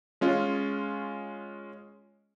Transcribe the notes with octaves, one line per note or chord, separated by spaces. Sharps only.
G#3 C#4 F4